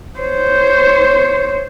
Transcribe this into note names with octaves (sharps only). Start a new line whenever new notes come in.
C5 C#5